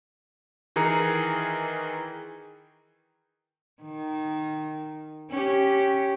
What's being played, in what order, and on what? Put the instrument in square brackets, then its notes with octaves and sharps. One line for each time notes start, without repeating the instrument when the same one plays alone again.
[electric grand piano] D#3 E3 G#4 A#4 A#5 C#7
[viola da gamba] D#3
C#4 G4